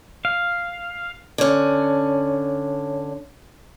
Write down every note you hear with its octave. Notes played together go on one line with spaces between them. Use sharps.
F5
D3 C#4